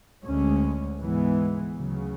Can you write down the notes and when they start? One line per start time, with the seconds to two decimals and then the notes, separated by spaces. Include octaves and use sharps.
0.24 D2 D3 G#3 C#4
1.00 G#2 E3 G#3 B3
1.75 D2 C#3 F#3